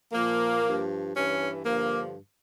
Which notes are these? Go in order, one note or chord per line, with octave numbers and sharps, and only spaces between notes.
A#2 F3 A#3
G2 F3
G2 E3 C#4
G2 D3 F3 A#3